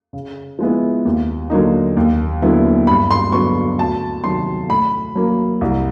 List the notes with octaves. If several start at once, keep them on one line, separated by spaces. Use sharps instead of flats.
C#3
F3 G#3 B3 E4
D#2
D3 F#3 A#3 D#4
D#2
D3 F#3 B3 E4
G2 B5
C6
D3 F#3 B3 C#6
D2 A5
C3 D#3 F#3 C6
A2 B5
F#3 A#3
C2